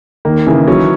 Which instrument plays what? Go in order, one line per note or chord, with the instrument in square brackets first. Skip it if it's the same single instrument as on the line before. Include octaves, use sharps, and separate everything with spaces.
[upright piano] D#3 [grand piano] A#3
[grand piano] C#3 [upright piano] E3
[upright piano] F#3 [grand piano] C#4